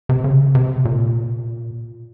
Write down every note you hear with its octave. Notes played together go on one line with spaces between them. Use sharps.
C3
C#3
C3
A#2